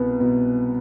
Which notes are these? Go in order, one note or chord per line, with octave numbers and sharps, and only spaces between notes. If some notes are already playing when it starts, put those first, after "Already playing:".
Already playing: C2 B2 B3
B2